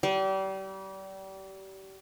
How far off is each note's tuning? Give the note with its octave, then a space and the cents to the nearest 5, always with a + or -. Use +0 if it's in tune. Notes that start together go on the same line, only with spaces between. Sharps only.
G3 -30